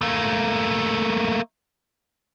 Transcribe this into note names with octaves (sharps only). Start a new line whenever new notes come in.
A3 A#3